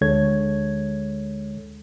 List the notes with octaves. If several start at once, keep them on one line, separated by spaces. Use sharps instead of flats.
D2 D3 G#3 A4 C#5 G#6